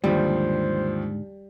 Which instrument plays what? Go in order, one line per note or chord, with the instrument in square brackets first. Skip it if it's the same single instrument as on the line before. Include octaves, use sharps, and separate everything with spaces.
[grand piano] D#2 F3 [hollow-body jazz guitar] G#2 D3 [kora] G3 [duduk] C5